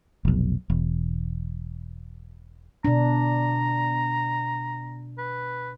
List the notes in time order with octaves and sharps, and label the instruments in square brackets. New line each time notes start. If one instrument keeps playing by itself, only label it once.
[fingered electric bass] F1 B1
E1
[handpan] B2 D4 [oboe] A#5
[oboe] B4